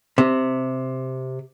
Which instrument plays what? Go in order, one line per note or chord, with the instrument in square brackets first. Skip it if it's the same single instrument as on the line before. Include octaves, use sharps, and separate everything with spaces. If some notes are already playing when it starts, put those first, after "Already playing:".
[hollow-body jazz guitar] C3